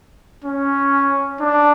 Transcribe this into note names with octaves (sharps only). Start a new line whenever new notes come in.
C#4
D4